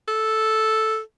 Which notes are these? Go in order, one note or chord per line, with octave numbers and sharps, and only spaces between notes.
A4